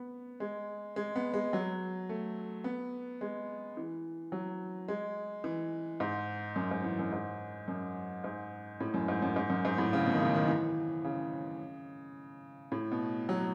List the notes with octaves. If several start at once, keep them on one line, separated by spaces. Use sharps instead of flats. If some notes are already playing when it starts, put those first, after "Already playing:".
Already playing: B3
G#3
G#3
B3
G#3
F#3
A3
B3
G#3
E3
F#3
G#3
E3
G#2
F#2
G#2
E3
F#2
G#2
F#2
G#2
A2
F#2
G#2
F#2
G#2
F#2
G#2
A2
C#3
B2
D#3
C#3
D#3
E3
C#3
A2
B2
F#3